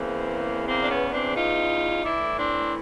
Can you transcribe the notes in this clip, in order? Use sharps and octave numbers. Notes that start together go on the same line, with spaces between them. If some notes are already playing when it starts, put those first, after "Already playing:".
Already playing: E2 C#3 E3 A#3 C4
A#3 C4
D4
B3 C#4
C4 D4
D#4 F4
A2 E3 D4 E4
C4 D4